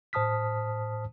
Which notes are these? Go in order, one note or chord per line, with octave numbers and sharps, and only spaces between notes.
A2 C5 A5 D#6 F6 B6